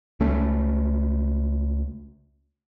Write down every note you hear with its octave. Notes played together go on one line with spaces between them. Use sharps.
C#2 A3 C#4